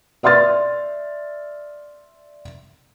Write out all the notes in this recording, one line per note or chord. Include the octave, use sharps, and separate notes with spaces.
D5 E5 C6 F6 A6